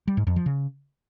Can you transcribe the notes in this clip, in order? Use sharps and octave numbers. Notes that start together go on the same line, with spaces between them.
G3
G#2
F2
F3
C#3